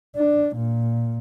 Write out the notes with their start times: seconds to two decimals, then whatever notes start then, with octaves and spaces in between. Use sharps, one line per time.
0.16 D4
0.57 A#2